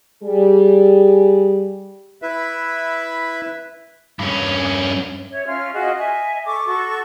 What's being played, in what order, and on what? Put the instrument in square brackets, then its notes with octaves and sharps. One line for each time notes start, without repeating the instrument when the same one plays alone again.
[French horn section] G3 G#4
[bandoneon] E4 B4 E5
[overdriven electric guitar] G2 C#4
[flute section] C#5 E5
C#4 F4 E5 F6
F4 F#4 G#4 D#5
D#5 E5 G#5
A4 C#6 D6
F#4 A4 C#6